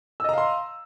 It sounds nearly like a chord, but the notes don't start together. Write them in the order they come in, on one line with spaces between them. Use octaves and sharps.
E6 D#5 A#5 F5 C6